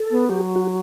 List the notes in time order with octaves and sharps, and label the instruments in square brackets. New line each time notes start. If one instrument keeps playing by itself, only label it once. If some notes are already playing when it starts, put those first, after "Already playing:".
Already playing: [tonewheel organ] A4
[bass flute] B3
[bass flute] F#3 [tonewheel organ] G4
[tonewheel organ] F#4